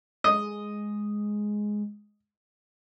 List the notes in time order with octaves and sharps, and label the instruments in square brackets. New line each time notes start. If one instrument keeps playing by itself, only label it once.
[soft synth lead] G#3 [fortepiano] D#5